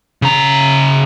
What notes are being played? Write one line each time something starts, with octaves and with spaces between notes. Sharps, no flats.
C#3 A#5